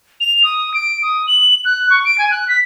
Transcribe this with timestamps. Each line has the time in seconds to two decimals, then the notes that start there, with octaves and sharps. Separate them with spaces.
0.20 F7
0.44 D#6
0.74 D7
1.03 D#6
1.27 F#7
1.65 F#6
1.90 C#6
2.05 D7
2.18 G#5
2.31 F#6
2.48 B6